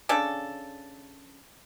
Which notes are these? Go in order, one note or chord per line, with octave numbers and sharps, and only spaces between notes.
C#3 D4 A4